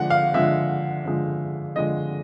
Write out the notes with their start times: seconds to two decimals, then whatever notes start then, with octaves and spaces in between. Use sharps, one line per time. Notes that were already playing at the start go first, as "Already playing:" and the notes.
Already playing: D3 F3 G#3 F#5
0.10 F5
0.34 D3 F3 G#3 E5
1.05 D3 F3 G#3
1.76 D3 F3 G#3 D#5